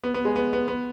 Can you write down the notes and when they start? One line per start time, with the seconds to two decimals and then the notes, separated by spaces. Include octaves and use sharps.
0.04 B3
0.14 B3
0.25 G#3
0.36 B3
0.53 B3
0.68 B3